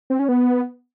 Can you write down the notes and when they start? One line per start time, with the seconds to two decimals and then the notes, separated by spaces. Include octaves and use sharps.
0.10 C4
0.19 C#4
0.29 B3